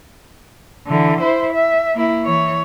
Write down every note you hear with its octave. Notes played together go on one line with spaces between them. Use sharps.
D3 E3
E4 C5
E5
A#3 E4
E3 C#5